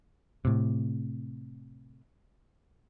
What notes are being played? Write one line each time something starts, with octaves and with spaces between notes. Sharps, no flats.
A2 C3